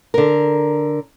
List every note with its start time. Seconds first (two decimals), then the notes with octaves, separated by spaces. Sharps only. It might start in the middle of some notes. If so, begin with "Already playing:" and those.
0.14 D3 A#4